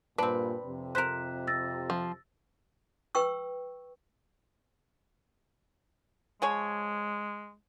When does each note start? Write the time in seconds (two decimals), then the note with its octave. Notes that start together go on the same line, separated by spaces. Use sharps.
0.18 G2 A#2 C4 D4 B4 B5
0.65 F2 C3
0.95 A#4 C5 F#6 B6 E7
1.47 E6 A6 A#6
1.90 F3
3.15 B4 G5 C#6 E6
6.42 F3 G#3 G#4 C#5